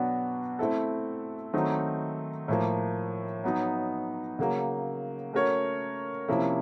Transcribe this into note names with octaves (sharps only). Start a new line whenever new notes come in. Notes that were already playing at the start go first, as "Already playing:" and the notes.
Already playing: B2 F#3 B3 D4 F#4
A3 C4 E4 A4
D#3 F#3 A3 C4 D#4
A2 F3 A#3
F#3 B3 D#4
C#3 F#3 A#3
A3 C#4 F#4 A#4 C#5
C3 F3 A#3 C#4 E4